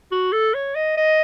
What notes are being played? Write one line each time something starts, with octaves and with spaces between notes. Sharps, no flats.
F#4
A4
C#5
D#5
D#5